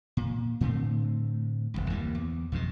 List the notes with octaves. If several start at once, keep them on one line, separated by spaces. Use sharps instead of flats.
A#2
A2 D3 A3 C4
D1 G1 C2
D2 E3 G3 A#3
E2
B1 F2 G#2 B2